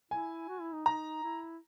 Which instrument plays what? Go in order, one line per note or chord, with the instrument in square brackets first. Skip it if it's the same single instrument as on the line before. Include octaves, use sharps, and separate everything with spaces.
[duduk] E4 [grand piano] G#5
[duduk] F#4
E4
D#4
[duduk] D#4 [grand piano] A#5
[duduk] E4